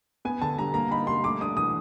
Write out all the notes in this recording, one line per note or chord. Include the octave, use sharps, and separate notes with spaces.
B3 G#5
D3 A5
G3 A#5
A#3 A#5
D#4 B5
G3 C6
A3 D6
D4 D#6
E3 D#6